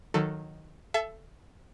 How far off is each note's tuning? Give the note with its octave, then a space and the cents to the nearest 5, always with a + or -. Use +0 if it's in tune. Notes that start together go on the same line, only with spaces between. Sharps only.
D#3 +0 F#3 -15 A4 +10
A4 +0 E5 +25 A5 -30